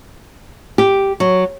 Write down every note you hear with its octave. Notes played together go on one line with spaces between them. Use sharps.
G4
F#3